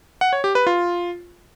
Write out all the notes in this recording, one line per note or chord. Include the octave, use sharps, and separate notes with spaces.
F#5
C#5
G4
B4
F4